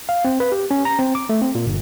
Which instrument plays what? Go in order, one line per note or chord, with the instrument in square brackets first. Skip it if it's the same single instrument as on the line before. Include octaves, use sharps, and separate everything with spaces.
[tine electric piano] F5
C4
B4
G4
C#4
A#5
C4
D6
A3
C4
A#2
G1